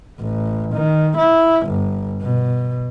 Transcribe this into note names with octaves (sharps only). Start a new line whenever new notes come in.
A1
D#3
E4
G1
B2